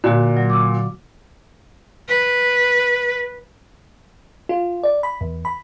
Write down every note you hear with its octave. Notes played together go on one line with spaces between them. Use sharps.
A#2 D3 A#3 F#4
F#3
D6 E6
B4
F4
D5
B5
E2
B5